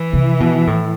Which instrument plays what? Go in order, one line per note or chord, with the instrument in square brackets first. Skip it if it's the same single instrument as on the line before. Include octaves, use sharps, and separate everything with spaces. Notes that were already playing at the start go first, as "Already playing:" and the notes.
Already playing: [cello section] E3
[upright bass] C3
B2
A2